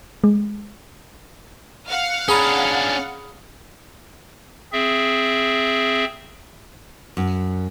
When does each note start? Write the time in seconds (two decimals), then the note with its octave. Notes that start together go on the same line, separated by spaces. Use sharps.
0.24 G#3
1.88 F5 F#5 F6
2.28 C#4 D4 G#4 A#5 B5
4.73 C4 G#4 E5
7.17 F#2